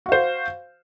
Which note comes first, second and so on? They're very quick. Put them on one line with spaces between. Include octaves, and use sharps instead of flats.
F#4 F5 C5